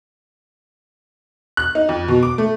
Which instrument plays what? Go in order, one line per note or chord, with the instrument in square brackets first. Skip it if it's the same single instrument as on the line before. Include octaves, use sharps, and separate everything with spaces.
[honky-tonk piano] F#6
D#4
F2
B2
D6
A3